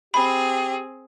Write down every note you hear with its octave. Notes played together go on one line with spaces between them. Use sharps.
C4 G4 G#4 B5